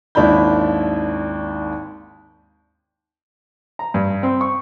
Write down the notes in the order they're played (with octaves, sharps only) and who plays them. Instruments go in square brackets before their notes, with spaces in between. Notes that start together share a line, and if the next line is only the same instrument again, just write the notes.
[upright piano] G#1 D#2 D4 E4 B5 G6
[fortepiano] A#5
G2
C4
C#6